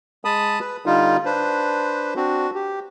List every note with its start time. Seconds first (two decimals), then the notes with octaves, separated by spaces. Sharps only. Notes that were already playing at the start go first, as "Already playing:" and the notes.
0.25 G#3 A5 B5 D#6
0.61 B4
0.86 D3 G3 D#4 F4
1.25 D4 B4 C5
2.16 C4 D4 F#4
2.55 G4